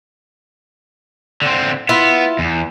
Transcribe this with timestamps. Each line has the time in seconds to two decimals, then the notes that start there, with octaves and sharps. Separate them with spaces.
1.42 D3 C4
1.89 B3 E4 F4
2.39 E2